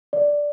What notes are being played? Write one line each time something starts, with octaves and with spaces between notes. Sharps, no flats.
D5